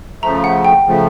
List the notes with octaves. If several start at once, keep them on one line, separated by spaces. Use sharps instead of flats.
C#3 F3 A3 A#5
F#5
G5
C#3 F3 A3